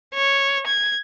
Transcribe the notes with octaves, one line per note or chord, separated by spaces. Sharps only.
C#5
G#6